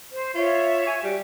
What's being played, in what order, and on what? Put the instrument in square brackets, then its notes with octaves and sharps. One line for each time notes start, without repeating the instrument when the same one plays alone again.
[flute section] C5
[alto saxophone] F4 [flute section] C#5 E5
[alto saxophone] G#5
[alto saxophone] G3 [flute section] F#4